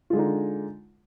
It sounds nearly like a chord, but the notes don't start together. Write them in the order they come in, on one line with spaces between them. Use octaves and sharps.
F4 G#3 D3 D#4